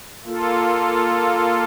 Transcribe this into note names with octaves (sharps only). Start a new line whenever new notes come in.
A#3 F4 A4